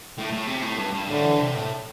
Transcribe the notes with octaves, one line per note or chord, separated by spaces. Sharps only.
A2
A2
C3
A2
G2
G2
A2 D3
E3
C3
A2